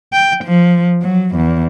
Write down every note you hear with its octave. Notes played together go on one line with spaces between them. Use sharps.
G5
F3
F#3
E2